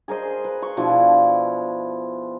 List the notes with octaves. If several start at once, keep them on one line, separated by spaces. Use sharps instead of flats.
G#4 A#4 C5 D#5
B4
C6 C#6
B2 F3 D4 E4